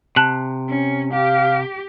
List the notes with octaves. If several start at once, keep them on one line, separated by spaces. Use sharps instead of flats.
C3 A5 F#6 F#7
C#4
G4 F5